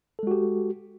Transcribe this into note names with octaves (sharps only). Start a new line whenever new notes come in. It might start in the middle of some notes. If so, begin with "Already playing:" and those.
G#3 F#4 G4 A4